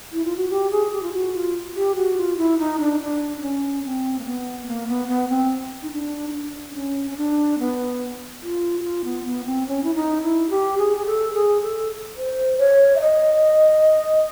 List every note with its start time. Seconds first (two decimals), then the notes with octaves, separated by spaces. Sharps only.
0.12 E4
0.25 F4
0.37 F#4
0.50 G4
0.71 G#4
0.92 G4
1.03 F4
1.13 F#4
1.33 F4
1.76 G4
1.96 F#4
2.17 F4
2.37 E4
2.58 D#4
2.80 D4
3.00 D4
3.41 C#4
3.84 C4
4.19 A#3
4.26 B3
4.67 A#3
4.88 B3
5.08 B3
5.29 C4
5.82 D#4
5.92 D4
6.28 D#4
6.34 D4
6.75 C#4
7.11 C#4
7.17 D4
7.59 B3
8.42 F4
8.79 F#4
8.83 F4
9.04 B3
9.25 B3
9.45 C4
9.67 C#4
9.84 E4
9.95 D#4
10.23 E4
10.50 G4
10.78 G#4
10.97 G#4
11.05 A4
11.34 G#4
11.62 A4
12.17 C5
12.58 C#5
12.96 E5
13.01 D#5